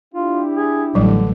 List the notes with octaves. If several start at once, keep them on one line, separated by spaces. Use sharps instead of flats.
D4 E4 F4 G4
G#4
A1 D3 F#3 G3